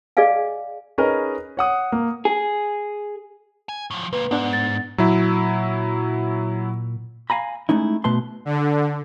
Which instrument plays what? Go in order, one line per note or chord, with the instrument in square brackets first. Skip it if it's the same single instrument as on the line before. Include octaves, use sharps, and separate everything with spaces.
[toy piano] G#4 D5 D#5 F5 G#5
[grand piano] C#4 D#4 G#4 A#4 B4 D#5
C#5 F#5 D#6
A#3
[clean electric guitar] G#4
[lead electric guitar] G#5
A2 F3
[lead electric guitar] C#2 A#3 [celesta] B4
[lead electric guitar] G#2 [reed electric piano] B3 D4 F#5
[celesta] A6
[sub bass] A#2 [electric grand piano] F#3 E4
[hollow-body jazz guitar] F5 G#5 A#5 B5
G#3 A3 C#4 D#4 E4
B2 A3 B4 A5 C6
[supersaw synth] D3